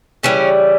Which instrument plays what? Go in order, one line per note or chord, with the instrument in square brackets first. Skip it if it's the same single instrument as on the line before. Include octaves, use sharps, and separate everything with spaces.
[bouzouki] C#3 E3 G3 C#4